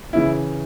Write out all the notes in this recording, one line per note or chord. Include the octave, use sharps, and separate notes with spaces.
C#3 E3 E4